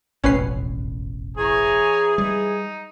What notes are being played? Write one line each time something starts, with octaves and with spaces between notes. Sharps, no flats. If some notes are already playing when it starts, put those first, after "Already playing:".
E1 A1 F2 C#4 B4 C7
E3 G#4 C#5 G#5 A#5
G3 D#4